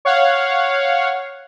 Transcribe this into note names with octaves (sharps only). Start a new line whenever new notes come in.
C#5 F5 F#5